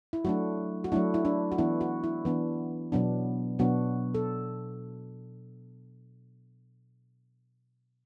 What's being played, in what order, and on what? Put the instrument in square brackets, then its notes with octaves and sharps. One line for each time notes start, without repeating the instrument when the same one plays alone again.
[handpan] E4
F#3 A3 D4 F#4
F#4
F#3 A3 D4 E4
E4
D4
F#4
E3 B3 D4 E4
F#4
E4
E3 B3 D4
B2 F#3 B3 D4
B2 F#3 B3 D4 F#4
A4